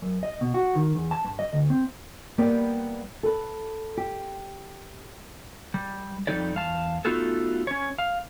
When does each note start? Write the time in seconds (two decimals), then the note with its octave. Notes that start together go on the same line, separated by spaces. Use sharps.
0.02 F#2
0.23 D#5
0.41 B2
0.54 F#4
0.75 D#3
0.95 E2
1.11 A5
1.24 G2
1.39 D#5
1.53 D2
1.70 C4
2.38 G3 A#3 B3 G4 B4 D5
3.23 A4 B4
3.97 G4
5.74 G3
6.27 F2 C3 G3 D#4 A4 D5
6.55 E2 F5 A5
7.05 A3 B3 D#4 F4 F#4 A4
7.67 C#4 C#5
7.98 F5